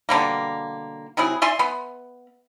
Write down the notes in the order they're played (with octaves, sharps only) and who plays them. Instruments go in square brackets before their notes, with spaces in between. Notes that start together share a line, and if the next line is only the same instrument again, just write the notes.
[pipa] B2 D3 G3 A#3
C3 F#3 E4 G#4
D5 E5 G#5 C6
B3